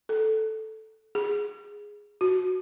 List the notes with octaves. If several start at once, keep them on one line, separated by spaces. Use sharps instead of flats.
A4
G#4
F#4